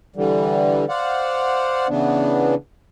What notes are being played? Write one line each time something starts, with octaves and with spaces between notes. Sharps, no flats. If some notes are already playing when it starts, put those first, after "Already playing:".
D3 E3 G3
C5 D5 F5 F#5
C#3 E3 B3 D4